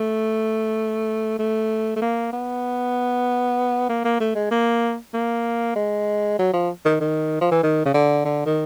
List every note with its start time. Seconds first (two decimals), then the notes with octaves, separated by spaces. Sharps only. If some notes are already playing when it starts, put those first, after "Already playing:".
Already playing: A3
1.39 A3
1.96 A3
2.02 A#3
2.33 B3
3.89 A#3
4.04 A#3
4.20 A3
4.35 G#3
4.51 A#3
5.13 A#3
5.76 G#3
6.39 F#3
6.53 F3
6.85 D#3
7.00 D#3
7.41 F3
7.51 E3
7.63 D#3
7.85 C#3
7.94 D3
8.25 D3
8.46 D#3